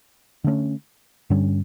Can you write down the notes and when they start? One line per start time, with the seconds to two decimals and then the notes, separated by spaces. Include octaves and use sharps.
0.44 D3 A3 C#4
1.30 G2 D3 G3 C#4